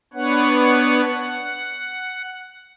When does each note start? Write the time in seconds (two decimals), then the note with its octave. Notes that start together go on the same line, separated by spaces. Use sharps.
0.13 B3 D4 B4 C#5 F#5
1.12 F#5